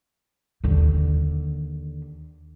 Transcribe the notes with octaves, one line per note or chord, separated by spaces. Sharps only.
D#2 D3